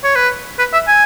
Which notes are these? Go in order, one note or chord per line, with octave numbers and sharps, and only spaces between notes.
C#5
B4
B4
E5
G#5